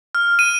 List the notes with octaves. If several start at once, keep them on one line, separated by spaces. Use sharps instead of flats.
F6
D#7